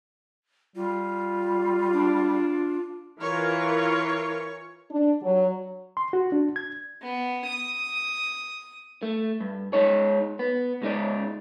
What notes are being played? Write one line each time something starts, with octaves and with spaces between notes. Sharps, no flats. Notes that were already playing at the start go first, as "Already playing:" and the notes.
G3 F4
D4
E3 F4 A#4 C#5
D4
F#3
C6
F#4
D4
G#6
B3
D#6
A3
G2
G#3 D#4 C#5
B3
C#2 G#3 D#4 D5